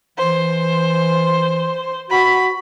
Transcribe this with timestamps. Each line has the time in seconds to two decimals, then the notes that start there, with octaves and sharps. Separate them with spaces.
0.18 E3 C5
2.10 F#4 B5